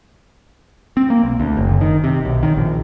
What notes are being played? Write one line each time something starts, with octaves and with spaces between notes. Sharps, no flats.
C4
A#3
B1
D2
F#1
D#3
C3
B1
D#3
A#1